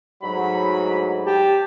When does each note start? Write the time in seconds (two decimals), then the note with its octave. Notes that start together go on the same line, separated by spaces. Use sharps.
0.23 D2 G#2 F#3 B5
1.26 G4 A5